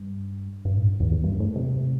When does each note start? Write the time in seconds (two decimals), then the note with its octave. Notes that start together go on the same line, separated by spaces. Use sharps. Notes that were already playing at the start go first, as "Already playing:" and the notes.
Already playing: G2
0.65 G2
0.77 A2
0.88 G2
1.00 E2
1.12 E2
1.24 G2
1.40 A2
1.56 C3